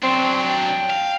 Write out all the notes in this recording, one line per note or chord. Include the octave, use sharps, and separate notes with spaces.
F#3 C4 D4
G5
F5